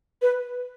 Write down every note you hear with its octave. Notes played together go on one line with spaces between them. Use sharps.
B4